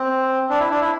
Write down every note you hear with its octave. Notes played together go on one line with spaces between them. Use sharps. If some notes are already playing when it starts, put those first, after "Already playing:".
Already playing: C4
D4
E4
D4
E4